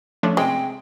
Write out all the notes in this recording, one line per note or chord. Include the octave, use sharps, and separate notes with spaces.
F3 A3 C#4 D4
C3 G#3 D#5 G5 D#6